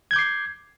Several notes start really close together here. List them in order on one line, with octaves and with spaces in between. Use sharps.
G#6 G6 D6 C7